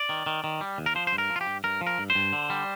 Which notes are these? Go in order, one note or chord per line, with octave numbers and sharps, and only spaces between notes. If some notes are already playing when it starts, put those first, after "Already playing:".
Already playing: D5
D#3
D#3
D#3
G3
D#2
A#4
F3 C5
C5
G2
A#4
F3
F4
G4
G2
G2 A#4
F3
A#4
G2
C5
G2
D3
G3